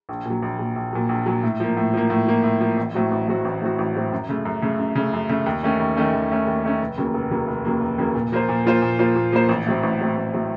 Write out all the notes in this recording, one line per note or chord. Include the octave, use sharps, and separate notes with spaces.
A#1
A#2 F#3
A#1
A#2 F#3
A#1
A#2 F#3
A#1
A#2 F#3
A2
F3 A#3
A2
F3 A#3
A2
F3 A#3
A2
F3 A#3
A1
A2 F#3 C4 F#4
A1
A2 F#3 C4 F#4
A1
A2 F#3 C4 F#4
A1
A2 F#3 C4 F#4
F#2
C#3 A3
F#2
C#3 A3
F#2
C#3 A3
F#2
C#3 A3
D#2
D#3 A3 C#4
D#2
D#3 A3 C#4
D#2
D#3 A3 C#4
D#2
D#3 A3 C#4
F1
D#2 C#3 F#3 A#3
F1
D#2 C#3 F#3 A#3
F1
D#2 C#3 F#3 A#3
F1
D#2 C#3 F#3 A#3
A#2
F3 A#3 F4 C5
A#2
F3 A#3 F4 C5
A#2
F3 A#3 F4 C5
A#2
F3 A#3 F4 C5
A1
A2 F#3 C4
A1
A2 F#3 C4
A1
A2 F#3 C4